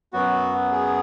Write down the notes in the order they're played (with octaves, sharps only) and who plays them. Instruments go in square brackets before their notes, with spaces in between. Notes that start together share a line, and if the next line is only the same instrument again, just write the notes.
[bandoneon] F#2 F#3 B3 F#4
G#4